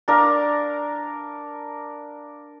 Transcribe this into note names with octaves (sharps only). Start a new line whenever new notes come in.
D4 A#4 F5